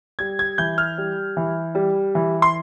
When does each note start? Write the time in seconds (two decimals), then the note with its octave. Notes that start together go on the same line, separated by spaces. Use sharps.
0.19 G3 G#6
0.39 G#6
0.58 E3 G6
0.78 F6
0.98 G3
1.37 E3
1.75 G3
2.15 E3
2.42 C6